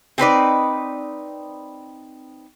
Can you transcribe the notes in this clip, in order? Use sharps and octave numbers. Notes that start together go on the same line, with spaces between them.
C4 D#4 B4 D5